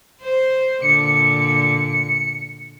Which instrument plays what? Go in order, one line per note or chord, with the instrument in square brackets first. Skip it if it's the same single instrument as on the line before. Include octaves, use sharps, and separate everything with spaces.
[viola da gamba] C5
[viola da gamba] A#2 D3 [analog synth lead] C#7